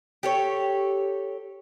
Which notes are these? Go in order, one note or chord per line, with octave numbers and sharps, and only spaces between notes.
G4 A4 C#5